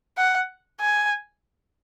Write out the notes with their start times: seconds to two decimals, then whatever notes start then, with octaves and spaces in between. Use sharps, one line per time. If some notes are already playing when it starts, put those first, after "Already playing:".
0.18 F#5
0.80 G#5